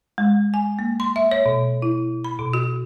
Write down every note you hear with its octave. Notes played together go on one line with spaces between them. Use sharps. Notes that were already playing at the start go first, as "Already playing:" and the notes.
G#3
G#5
A#3
C6
E5
C#5
B2
E4
B5
B2
F#4